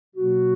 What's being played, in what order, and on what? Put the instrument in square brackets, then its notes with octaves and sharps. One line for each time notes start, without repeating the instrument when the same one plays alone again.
[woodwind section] B2 F#3 A#3 F#4